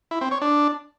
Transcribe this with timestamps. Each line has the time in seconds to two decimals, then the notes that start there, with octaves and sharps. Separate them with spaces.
0.11 E4
0.21 C4
0.31 C#5
0.42 D4